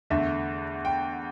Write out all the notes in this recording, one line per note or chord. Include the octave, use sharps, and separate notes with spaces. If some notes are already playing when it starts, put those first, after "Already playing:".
E2 D3 A3 E5
G5